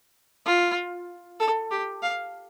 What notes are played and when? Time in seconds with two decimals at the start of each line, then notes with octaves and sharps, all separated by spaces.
0.46 F4
1.40 A4
1.71 G4
2.02 F5